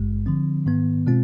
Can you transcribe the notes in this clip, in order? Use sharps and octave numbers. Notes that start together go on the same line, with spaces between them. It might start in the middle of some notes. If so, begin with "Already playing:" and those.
Already playing: G#1 G2 G#3
D3 F3 C4
G#2 D#3 B3
B2 G#3 C4 F4